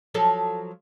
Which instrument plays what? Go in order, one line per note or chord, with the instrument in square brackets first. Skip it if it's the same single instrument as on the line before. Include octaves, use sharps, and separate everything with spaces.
[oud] F3 F#3 A4